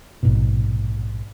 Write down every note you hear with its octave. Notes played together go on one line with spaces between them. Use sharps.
A#1 G#2 B2